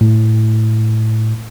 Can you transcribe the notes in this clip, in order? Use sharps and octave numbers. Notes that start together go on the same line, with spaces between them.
A2